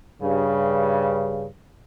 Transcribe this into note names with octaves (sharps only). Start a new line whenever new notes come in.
G2 C#3